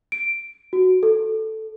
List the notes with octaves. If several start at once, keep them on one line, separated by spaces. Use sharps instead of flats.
D7
F#4
A4